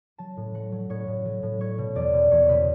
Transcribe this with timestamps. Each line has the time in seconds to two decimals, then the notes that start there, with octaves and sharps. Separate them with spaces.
0.18 F#3 A5
0.37 A2
0.54 F#3 F#5
0.72 F#3
0.89 A2 C#5
1.07 A2
1.25 F#3
1.43 A2
1.60 F#3 C#5
1.78 B2
1.95 E2 D5
2.13 B2
2.31 E2 C#5
2.49 B2 B4